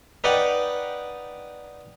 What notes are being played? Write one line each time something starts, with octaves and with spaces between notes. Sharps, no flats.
D#4 B4 D5 D#5 F#5 G5